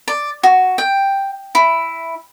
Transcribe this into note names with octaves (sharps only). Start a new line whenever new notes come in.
D5
F#4
G5
E4